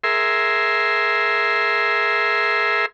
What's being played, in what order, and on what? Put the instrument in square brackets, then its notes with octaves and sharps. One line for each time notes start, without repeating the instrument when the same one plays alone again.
[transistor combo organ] G#4 A#4 E5 C6